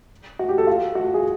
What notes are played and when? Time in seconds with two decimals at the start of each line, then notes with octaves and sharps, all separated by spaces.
0.39 F#4
0.49 G4
0.58 A4
0.67 F4
0.95 F#4
1.14 G#4